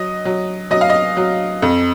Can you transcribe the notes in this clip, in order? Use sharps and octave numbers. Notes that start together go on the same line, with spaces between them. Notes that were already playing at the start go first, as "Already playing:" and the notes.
Already playing: F#3 D#5
F#3
F#3 D#5
F5
D#5
F#3
F2